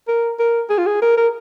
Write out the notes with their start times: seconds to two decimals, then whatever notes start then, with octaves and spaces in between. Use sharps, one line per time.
0.08 A#4
0.39 A#4
0.70 G#4
0.78 F4
0.87 G#4
1.02 A#4
1.17 A#4